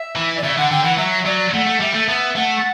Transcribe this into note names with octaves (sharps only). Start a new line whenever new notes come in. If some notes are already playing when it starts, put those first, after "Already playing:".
Already playing: E5
E3
D5
C#3 E5
D3 F#5
D3 G5
E3 F#5
F#3 E5
F#3 D5
A3 F#5
A3
G3 E5
A3
B3 E5
A3 F#5